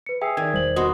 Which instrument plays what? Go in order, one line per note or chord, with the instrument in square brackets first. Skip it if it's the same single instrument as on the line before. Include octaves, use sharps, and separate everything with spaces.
[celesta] B4 C#7
[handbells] G#4 E5 G#5 [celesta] G5 E6 C7
[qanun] D#3 [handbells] D5 G#6
[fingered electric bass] E1 G3 [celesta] C5 F#7
[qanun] B3 F#4 [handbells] D#5 C6 [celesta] D#6